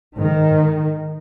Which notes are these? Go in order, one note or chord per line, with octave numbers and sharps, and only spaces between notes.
G#2 D#3
G#2